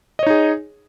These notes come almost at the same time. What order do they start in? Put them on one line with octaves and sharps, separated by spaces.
D#5 C#5 D#4 G#4